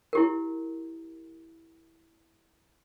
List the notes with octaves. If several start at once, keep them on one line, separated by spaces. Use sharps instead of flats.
E4 G4 A#4